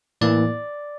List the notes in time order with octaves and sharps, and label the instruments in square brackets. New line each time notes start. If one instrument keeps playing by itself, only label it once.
[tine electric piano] A2 E3 A#3 D5